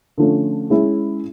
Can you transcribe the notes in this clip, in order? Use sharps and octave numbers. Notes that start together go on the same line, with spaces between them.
D3 F3 A3 C#4
G#3 C#4 E4 G#4